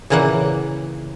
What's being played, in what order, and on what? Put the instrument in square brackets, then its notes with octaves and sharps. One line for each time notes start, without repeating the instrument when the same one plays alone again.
[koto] A#2 C#3 E3 A#3 F#5